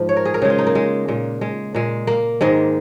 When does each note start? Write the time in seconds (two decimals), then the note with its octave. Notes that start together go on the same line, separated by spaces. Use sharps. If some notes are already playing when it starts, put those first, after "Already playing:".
Already playing: G#2 F3
0.09 C#5
0.17 A#4
0.25 G#4
0.34 A#4
0.42 C#3 G#3 G#4
0.50 F4
0.58 D#4
0.67 A#3
0.75 G#3
1.08 A#2 G#3
1.41 G#3
1.74 A#2 G#3
2.07 A#3
2.41 G#2 D#3 G#3